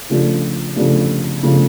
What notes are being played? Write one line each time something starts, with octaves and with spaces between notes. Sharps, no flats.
C#3 F3 A3 D4
C#3 F3 A3 D4
C#3 F3 A3 D4